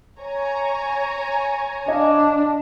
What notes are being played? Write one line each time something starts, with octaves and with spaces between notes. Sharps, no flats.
C#5 G#5 A#5
D4 D#5 F5